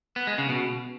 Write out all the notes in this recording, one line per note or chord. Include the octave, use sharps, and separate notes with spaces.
B3
G#3
C#3
B2